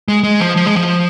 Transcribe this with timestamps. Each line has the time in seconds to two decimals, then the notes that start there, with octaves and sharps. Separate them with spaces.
0.08 G#3
0.23 G#3
0.40 F3
0.57 F3
0.66 G#3
0.75 F3